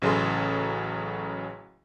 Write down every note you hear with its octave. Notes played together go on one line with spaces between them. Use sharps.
A1 C#3 F#3 G#4 A4 C6